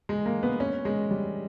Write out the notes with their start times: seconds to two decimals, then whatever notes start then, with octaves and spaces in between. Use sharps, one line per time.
0.09 G#3
0.25 A#3
0.43 B3
0.60 C#4
0.85 G#3
1.11 G3